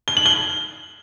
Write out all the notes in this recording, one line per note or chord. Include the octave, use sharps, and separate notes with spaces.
G7
F#7
G7